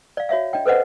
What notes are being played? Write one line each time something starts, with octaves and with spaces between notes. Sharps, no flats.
D5 F5
F#4 C#5 E5 F5
D4 D#5 G5
A4 B4 C5 D#5 F#5